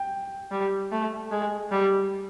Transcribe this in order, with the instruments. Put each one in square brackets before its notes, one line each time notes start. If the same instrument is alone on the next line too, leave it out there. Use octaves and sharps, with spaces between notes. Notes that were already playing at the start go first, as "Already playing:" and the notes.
Already playing: [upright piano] G5
[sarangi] G3
A3
G#3
G3